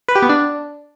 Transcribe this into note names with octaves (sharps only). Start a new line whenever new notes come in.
B4
G4
B3
D4